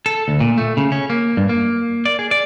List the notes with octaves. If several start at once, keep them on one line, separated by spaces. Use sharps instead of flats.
A4
D2
A#2
A3
C#3
C#4
A#3
G2
A#3
D5
G#4
D5